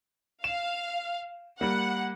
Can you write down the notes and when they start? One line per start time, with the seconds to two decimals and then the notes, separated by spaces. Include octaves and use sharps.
0.44 F5 E7
1.61 G3 A#3 F#5